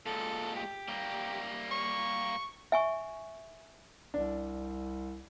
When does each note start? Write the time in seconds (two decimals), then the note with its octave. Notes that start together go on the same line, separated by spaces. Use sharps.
0.06 A#2 G#3 A4
0.56 G4
0.88 G3 A#3
1.71 C#6
2.72 E5 G#5 C#6
4.14 C2 D4